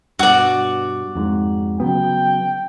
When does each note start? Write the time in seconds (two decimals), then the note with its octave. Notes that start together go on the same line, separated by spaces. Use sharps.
0.19 G2 B2 F#4 D5
1.15 F2 G#2
1.80 C#3 F#3 B3 G5